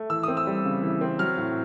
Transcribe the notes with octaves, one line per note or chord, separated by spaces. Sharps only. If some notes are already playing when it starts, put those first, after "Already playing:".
Already playing: A3
E3 E6
C4 D#6
E6
G3
C#3
E3
C4
F#3 F6
A2